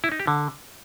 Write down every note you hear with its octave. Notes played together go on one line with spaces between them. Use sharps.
E4
D#4
G4
D3